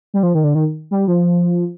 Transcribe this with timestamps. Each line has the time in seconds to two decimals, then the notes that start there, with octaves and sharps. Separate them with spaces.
0.14 G3
0.23 F3
0.35 D#3
0.44 D3
0.55 D#3
0.91 G3
1.08 F3